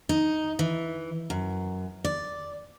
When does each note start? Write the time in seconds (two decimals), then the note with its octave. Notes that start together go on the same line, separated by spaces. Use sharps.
0.09 D#4
0.59 E3
1.30 F#2
2.04 D5